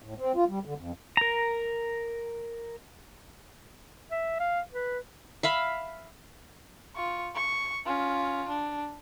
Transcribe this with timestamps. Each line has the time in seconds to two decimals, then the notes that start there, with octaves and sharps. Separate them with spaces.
0.02 A2
0.18 C4
0.36 F4
0.48 G3
0.65 D3
0.78 F2
1.17 A#4 A#5
4.11 E5
4.39 F5
4.73 B4
5.43 E5 F5 B5
6.96 F4 C#6
7.35 C#6
7.86 C#4 F4
8.48 D4